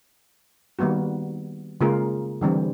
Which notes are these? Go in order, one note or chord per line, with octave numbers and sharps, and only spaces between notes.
D#3 G3 A#3 B3 F#4
C#3 G#3 A#3 F4 G#4 A#4
D3 E3 G3 C4